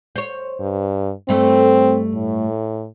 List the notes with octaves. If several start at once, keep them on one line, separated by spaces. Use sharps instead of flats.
C5 C#5
G2
G2 A3 C4
A2